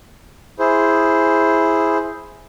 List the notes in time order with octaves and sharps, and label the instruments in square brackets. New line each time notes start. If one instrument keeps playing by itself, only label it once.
[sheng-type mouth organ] E4 G#4 C5